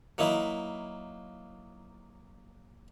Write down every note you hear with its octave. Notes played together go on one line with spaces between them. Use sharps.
F#3 A#3 D#4 E4